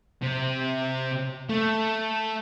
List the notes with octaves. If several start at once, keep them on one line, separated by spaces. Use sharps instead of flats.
C3
A3